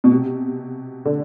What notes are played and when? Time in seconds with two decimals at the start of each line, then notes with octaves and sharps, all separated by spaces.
0.04 B2
0.12 C3
1.05 D3